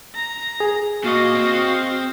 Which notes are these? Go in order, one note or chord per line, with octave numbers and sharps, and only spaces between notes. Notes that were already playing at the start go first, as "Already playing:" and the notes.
A#5
G#4
A#2 F#4 D#5 F5
C4